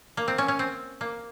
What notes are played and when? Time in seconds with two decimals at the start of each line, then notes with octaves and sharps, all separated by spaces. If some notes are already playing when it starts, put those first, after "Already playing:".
0.17 A#3
0.28 C4
0.38 C#4
0.48 C#4
0.59 C4
1.01 A#3